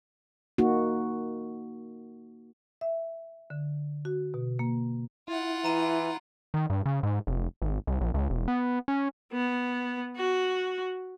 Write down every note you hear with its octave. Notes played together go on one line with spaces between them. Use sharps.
A#3 D#4 F#4
E5
D3
F#4
B2
A#3
E4 F4 F#5
E3 A#5 D#7
D#3
G2
C#3
G#2
F1
G#1
C2
A#1
C#2
E1
B3
C#4
B3
F#4